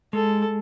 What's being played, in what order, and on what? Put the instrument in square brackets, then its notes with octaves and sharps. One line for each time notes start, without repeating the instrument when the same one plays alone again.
[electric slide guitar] G#3 [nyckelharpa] A4